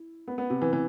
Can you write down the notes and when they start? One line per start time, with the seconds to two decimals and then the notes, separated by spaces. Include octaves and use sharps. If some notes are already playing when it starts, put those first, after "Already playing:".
Already playing: E4
0.28 B3
0.38 B3
0.50 C3
0.61 E3
0.73 E3